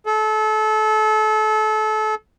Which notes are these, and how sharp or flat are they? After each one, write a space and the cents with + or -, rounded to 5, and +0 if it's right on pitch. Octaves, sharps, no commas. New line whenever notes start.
A4 -30